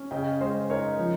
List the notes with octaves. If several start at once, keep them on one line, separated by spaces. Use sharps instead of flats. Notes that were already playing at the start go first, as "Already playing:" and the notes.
Already playing: C#4
C#3 D#5 G5
G#3 C5 D#5
D#4 A#4 C#5
F3